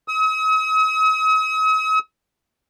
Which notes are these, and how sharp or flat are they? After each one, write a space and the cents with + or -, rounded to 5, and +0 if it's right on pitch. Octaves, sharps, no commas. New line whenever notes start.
D#6 +45